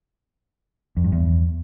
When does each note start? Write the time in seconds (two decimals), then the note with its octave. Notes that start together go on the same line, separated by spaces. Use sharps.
0.97 F2
1.04 G2
1.12 E2